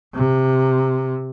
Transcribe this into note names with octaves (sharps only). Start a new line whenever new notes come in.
C3